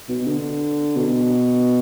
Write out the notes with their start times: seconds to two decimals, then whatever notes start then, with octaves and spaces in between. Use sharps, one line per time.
0.09 B2
0.27 D3
0.96 B2